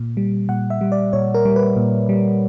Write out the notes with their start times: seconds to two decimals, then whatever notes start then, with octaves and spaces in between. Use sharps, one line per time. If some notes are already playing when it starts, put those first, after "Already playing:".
Already playing: A#2
0.17 G3
0.49 A#2 F#5
0.70 E5
0.81 G3
0.92 D5
1.13 A#2 C#5
1.34 A#4
1.45 G3
1.56 B4
1.77 A#2
2.09 G3